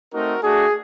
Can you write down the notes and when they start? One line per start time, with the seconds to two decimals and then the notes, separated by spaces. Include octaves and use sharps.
0.12 A3 C4 D#4 F#4 A#4
0.42 A3 D4 F#4 G#4